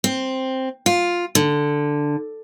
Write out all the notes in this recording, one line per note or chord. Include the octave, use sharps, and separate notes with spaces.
C4
F4
D3